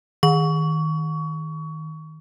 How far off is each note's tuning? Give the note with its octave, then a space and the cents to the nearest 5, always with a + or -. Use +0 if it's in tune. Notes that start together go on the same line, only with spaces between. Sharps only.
D#3 +15 C#6 +25